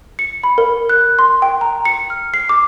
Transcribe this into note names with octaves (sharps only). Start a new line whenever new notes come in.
C#7
B5
A#4
F#6
C6
G5
A#5
C#7
F6
C7
D6